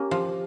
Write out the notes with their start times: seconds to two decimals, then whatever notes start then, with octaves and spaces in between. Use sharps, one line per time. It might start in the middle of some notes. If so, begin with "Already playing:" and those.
Already playing: A#3 C#4 G4
0.11 F3